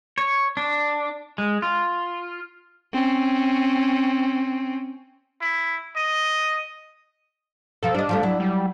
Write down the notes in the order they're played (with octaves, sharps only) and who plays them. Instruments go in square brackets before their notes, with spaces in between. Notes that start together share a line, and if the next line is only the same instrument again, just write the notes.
[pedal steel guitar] C#5
D4
G#3
F4
[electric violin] C4 C#4
[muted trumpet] E4
D#5
[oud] B2 F3 A#4 [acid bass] A4
[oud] G3 D#5 [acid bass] D4
[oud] F3 G3 A3
F#3 E4
[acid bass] G3